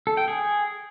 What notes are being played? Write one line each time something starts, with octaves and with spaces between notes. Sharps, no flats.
A4
G5
G#4